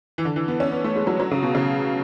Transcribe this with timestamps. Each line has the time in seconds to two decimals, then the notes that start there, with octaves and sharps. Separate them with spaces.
0.18 E3
0.25 D3
0.36 E3
0.48 B3
0.60 C#4
0.72 B3
0.84 A3
0.96 G#3
1.07 F#3
1.20 F#3
1.31 C#3
1.43 B2
1.55 C#3